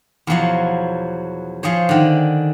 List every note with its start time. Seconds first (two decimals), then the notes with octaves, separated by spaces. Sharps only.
0.27 E2 B2 F3 F#3
1.63 F3 G#4 C5 C#5
1.89 D3 D#3